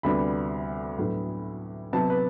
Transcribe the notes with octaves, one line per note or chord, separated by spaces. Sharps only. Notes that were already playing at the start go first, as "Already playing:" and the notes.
D2 C3 G3 B3 D4 B5
A2 F#3 B3 D4
C3 F#3 B3 A5
B4